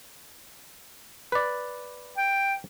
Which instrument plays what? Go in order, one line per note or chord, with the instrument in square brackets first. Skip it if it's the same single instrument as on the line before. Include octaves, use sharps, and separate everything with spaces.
[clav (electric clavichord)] B4 D5
[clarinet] G5